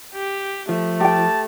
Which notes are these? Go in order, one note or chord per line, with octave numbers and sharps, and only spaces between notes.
G4
F3 A3
G4 G5 A5